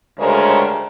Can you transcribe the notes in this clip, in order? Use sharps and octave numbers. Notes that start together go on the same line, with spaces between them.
D2 C#3 G3 G#3 A#4 C5